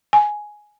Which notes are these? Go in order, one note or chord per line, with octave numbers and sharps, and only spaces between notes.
G#5